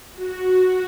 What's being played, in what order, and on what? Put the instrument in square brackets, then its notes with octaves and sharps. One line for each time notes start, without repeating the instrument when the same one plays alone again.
[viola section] F#4